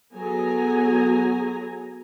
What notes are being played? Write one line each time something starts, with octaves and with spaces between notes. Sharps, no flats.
F#3 B3 G#4 A4 G#5 A#5